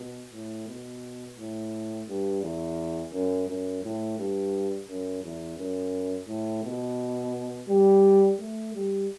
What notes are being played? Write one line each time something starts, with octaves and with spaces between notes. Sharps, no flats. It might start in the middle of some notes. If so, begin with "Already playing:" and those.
Already playing: B2
A2
B2
A2
G2
E2
F#2
F#2
A2
G2
F#2
E2
F#2
A2
B2
G3
A3
G3